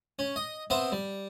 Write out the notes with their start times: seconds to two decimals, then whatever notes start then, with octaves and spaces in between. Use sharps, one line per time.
0.19 C#4
0.36 D#5
0.70 B3 C4 C5 E5
0.92 G3